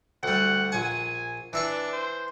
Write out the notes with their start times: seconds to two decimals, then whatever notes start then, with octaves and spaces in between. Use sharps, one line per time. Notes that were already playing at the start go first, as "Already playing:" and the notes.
0.23 D2 G3 F#5
0.72 A#1 F#5 G#5
1.53 E3 D4 E5 C#6
1.92 C5